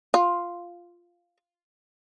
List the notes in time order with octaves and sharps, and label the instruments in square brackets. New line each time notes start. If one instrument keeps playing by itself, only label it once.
[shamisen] F4